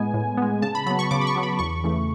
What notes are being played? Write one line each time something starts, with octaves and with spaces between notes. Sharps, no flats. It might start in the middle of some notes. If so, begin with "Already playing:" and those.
Already playing: A2 G#3 B3 G#5
A2
G#3 B3
C#3 A5
B5
F#3 B3 B5
C#6
C#3 D6
B5
C#6
F#3 B3
B5
E2 C#6
C#3 E3 A3